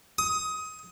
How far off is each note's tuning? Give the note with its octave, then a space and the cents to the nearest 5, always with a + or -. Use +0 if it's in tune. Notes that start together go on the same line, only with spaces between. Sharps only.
D#6 +20